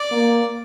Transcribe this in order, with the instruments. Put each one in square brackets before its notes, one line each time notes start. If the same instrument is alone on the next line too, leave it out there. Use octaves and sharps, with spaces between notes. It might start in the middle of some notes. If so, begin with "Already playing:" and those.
Already playing: [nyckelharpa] D5
[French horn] A#3